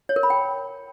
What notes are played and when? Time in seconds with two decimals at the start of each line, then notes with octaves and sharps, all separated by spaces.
0.09 C#5
0.16 A#4
0.23 B5
0.30 G5